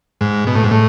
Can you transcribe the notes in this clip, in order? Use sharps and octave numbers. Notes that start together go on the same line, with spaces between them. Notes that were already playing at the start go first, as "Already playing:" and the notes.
G#2
B2
A2
G#2
A2